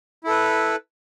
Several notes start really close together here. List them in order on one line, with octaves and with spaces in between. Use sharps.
E4 A4 B4